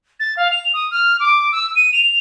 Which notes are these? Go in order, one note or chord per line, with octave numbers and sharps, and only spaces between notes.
A6
F5
F7
D#6
F6
D6
E6
D#7
F7